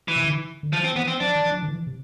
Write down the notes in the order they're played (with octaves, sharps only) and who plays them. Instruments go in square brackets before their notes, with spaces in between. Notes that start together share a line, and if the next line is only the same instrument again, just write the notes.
[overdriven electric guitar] E3
[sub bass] C3
D3
D3
[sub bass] E3 [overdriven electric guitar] F3
[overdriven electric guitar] C4
[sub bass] E3 [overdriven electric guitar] B3
[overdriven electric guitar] C4
[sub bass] F3 [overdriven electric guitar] D4
[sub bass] E3
F3
D3
E3
C3